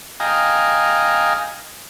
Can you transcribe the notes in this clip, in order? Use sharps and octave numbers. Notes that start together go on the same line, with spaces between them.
D#5 F5 G5 G#5 A#5